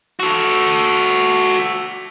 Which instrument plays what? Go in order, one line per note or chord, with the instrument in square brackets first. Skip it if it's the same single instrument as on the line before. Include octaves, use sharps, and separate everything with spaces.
[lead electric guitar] F#4 A4